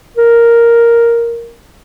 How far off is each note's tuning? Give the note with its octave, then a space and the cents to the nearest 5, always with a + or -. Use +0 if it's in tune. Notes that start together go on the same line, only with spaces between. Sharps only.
A#4 +0